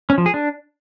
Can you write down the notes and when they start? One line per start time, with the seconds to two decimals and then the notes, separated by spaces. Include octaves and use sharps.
0.10 C#4
0.18 F3
0.26 G#4
0.34 D4